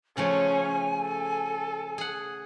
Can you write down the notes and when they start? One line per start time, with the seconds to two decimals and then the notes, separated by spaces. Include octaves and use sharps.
0.17 C#3 F3 A3 C#4 C#5 G#5
1.02 A4
1.98 G#4 F#5